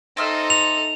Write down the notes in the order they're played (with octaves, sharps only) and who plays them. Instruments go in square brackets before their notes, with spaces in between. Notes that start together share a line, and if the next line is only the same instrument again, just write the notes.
[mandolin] C4 E5 F6 [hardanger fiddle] D#4 A4
[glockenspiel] F7